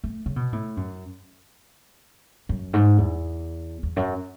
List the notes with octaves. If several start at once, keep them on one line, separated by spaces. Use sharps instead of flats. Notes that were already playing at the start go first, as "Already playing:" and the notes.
A3
C#3
B2
A2
F#2
F#2
G#2
E2
E2
F#2